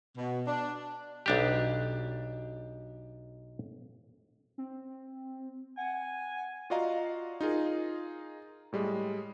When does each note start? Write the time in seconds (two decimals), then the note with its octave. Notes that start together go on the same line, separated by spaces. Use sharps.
0.17 B2
0.46 D4
1.26 B1 D4 G4
4.58 C4
5.77 F#5 G#5
6.70 F4 F#4 D5 D#5 F5 A#5
7.41 D#4 F4 G#4 A#4
8.73 A2 G3 G#3